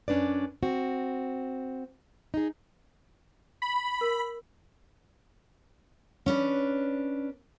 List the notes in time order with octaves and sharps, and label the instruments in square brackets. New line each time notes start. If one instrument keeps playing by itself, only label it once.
[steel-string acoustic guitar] F#2 C#4 D4 B4 D5
C4 F#4
D#4 G#4
[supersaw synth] B5
[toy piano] A#4
[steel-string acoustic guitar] C#4 D4 B4